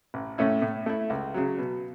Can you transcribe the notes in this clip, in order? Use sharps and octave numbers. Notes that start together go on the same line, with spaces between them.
A1
A2 A3 C#4 E4
A2
A3 E4
C#2
C#3 F#3
B2